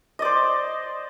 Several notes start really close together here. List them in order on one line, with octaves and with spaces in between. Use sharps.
D#5 D5 C5